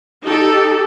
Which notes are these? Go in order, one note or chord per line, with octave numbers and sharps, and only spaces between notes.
D#4 G4 A4